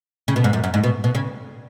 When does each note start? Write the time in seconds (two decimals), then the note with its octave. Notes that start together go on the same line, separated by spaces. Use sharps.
0.28 C#3
0.36 B2
0.44 G#2
0.53 F#2
0.64 F#2
0.74 G#2
0.84 B2
1.04 B2
1.15 C#3